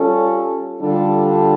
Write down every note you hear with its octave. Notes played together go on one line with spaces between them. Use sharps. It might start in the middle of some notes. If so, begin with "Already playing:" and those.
Already playing: G3 C#4 F4 A4
D3 G3 D4 F4 A4